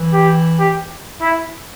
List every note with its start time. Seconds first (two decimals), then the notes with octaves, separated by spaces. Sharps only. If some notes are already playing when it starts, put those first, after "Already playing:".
Already playing: E3
0.13 G4
0.59 G4
1.21 E4